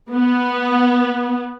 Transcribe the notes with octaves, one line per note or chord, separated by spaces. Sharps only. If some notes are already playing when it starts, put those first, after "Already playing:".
B3